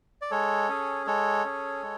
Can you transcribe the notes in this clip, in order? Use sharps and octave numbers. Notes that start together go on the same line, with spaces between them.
D5
G#3 A4 C#5
C#4 G#4
G#3 A4 C#5
C#4 G#4
G#3